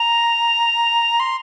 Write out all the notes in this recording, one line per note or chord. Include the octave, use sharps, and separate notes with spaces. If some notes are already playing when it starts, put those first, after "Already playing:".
Already playing: A#5
C6